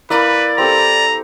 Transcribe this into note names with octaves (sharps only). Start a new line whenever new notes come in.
A#3 E4 B4 D5
C4 G4 A4 A#5